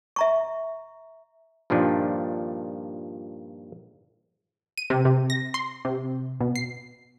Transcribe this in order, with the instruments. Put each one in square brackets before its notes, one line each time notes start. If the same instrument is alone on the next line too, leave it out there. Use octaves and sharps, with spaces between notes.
[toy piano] E5 A#5 C#6
[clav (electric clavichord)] G2 A#2 D#3 F3 D4
[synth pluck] D#7
C3
C3
A#6
C6
C3
B2
C7